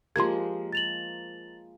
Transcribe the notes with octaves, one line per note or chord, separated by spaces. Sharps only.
F3 G#3 A#3 G4 C6 G#6
A6 F7 F#7